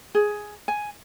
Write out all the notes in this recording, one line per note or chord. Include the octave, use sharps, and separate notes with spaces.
G#4
G#5